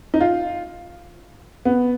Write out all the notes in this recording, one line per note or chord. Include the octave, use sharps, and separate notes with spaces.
D#4
F4
B3